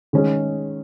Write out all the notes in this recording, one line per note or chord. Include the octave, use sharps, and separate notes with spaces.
D#3 G#3 C#4 G#4